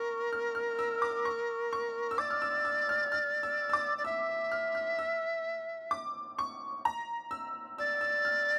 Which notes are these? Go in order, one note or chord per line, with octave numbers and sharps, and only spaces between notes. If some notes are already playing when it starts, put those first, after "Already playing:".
Already playing: A#4 C#6
F6
F6
E6
D6
C#6
C#6
E6
D5 D6
F6
E6
E6
F6
F6
E6
E6
D6
D5
E5 E6
F6
F6
E6
D6
C#6
A#5
E6
D5 E6
E6
F6